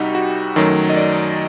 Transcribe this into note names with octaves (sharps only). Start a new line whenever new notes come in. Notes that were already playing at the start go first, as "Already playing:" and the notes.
Already playing: C2 C3 G3 D#4 F#4 G4
F#4
F#2 D#3 F#3 A3
D#5
D5